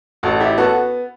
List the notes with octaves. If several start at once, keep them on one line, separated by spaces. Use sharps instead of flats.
A1 F#4 A4
E4 G4
B3 F#4 A4